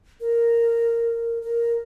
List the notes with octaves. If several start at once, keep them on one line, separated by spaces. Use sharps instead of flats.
A#4
A#4